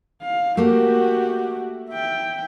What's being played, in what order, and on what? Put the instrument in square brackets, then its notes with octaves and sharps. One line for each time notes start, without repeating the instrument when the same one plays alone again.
[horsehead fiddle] F5
[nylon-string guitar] A3 A#3 [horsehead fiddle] F#4 G4
[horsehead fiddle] E5 G5